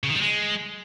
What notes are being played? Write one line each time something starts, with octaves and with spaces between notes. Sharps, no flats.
C#3
D#3
G3
G#3